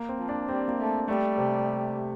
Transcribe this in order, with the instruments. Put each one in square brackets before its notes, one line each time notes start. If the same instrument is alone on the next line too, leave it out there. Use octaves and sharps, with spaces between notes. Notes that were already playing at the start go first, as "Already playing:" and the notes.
Already playing: [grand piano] A#3
C4
[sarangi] F3
[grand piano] D4
[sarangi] G3 [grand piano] C4
[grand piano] A#3
[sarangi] A3
[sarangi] G3 [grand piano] A3
[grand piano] C3